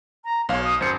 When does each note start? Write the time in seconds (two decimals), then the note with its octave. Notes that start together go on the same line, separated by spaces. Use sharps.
0.25 A#5
0.49 B1 C#5 F5
0.64 D#6
0.80 G#1 F#2 C5 C#7